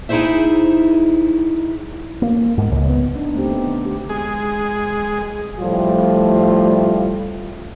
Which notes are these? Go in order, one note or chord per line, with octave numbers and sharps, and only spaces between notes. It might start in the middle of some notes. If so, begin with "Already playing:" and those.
D#4 E4 F#4 G#4 C5 E5
A#3
G#2
C#2
B3
D4 D#4
A3 C4 G4
B3
D3
G4
G#3 G#4
A2 F3 G3 A3 F4